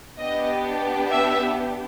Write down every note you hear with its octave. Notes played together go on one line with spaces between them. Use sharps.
B3 D4 G4 D#5
E5